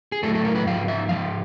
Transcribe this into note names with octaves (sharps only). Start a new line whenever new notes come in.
G#4
A2 F#3 A3 A4
A4
A#4
B4
G#2 F3 F5
E5
G#2 F3 F5